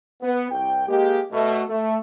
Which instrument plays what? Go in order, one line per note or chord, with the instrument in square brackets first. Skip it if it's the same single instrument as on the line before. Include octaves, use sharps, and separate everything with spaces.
[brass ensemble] B3
C2 G5
G#3 A#3 G4
B2 A3
A3